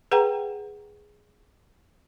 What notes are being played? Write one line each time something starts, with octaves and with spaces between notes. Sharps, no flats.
G#4 B4 F#5 G5 A#5